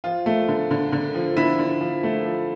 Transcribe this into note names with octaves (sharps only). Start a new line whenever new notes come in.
F3 F4
A3
D3
D3
D3
F3
D3 E4
D3
F3
A3
F3